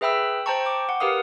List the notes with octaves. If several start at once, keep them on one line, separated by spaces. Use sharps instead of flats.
G#4 B4 E5 G5 B5 E6
C5 G5 A5 A#5 C#6
D6
F#5
G4 A#4 B4 F5 D#6